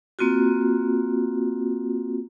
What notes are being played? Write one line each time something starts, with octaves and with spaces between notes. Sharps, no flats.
A#3 C4 F4 F#4